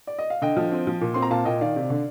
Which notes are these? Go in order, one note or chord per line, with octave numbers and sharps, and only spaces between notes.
D5
D#5
F5
D3 D#5 G5
F3
C4
F3
A#2
C4 C6
A#5
A#2 F5 A5
A#2 D#5 G5
D#3 D5 F5
C3
D3